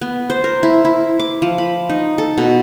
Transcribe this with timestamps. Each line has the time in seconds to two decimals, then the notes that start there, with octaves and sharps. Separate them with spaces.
0.01 B3
0.30 C5
0.44 A#4
0.63 E4
0.85 E4
1.19 D6
1.42 F3
1.58 B5
1.89 D#4
2.18 A4
2.38 B2